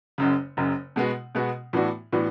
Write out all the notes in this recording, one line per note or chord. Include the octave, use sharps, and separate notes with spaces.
F#1 F#2 C#3
F#1 F#2 C#3
B2 G#3 B3 F#4
B2 G#3 B3 F#4
A2 E3 B3 D4 F#4
A2 E3 B3 D4 F#4